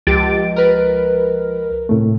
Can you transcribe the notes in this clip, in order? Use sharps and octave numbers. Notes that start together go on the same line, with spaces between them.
C#2 F3 G4 A6 D7
A#4 B4
A2 C3 A3